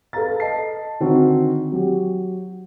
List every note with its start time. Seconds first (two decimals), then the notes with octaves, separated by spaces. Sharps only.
0.13 A4 B4 F5 A#5 A6
0.40 D#5 A5 C7
1.00 D3 D#3 C4 D#4 F#4
1.72 F#3 G4